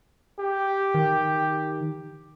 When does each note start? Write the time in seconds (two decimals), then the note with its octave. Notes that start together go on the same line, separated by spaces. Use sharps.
0.39 G4
0.94 D#3